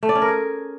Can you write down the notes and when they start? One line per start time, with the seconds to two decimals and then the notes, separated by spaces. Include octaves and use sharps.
0.03 A3
0.09 D5
0.15 C#4
0.22 A#4
0.28 G#4